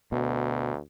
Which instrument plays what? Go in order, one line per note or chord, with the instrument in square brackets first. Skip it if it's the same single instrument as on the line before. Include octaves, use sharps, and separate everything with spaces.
[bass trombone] D2 [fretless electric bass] B2